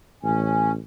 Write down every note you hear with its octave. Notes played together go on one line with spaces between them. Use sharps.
A1 C#4